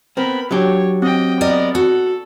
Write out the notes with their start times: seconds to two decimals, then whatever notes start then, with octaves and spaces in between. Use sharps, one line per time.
0.17 B3 C4 A#4 B5
0.51 F#3 D4 G4 C#5
1.02 C4 D#5 G5
1.41 B3 A#4 D5 D#5
1.75 F#4 A4